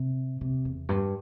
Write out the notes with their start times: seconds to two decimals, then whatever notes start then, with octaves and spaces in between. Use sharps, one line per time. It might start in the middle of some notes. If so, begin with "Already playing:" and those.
Already playing: C3
0.41 C3
0.65 E2
0.89 G2